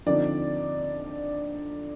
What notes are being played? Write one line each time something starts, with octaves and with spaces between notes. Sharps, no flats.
D3 F3 C4 D#4 D5